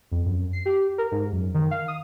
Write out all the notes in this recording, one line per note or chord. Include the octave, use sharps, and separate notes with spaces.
F2
F#2
C7
G4
A#4
G#2
F#2
D#3
F5
D#6